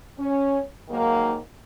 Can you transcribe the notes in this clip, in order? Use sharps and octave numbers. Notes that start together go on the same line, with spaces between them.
C#4
G#2 D#3 F#3 A#3